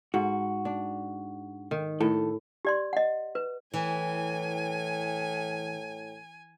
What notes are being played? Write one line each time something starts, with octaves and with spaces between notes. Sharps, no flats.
G#2 F#4
D4
D#3
A2 D#3 A4
G4 D5 C6
D#5 F#5
B4
A2 E3 G#5